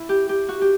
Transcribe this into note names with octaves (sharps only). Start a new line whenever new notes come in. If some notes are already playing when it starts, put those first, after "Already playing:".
Already playing: E4
G4
G4
F#4
G4